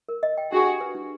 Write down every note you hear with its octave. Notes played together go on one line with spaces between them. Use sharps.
A#4
D#5
G5
D4 F#4 G#4
G4
B4
D4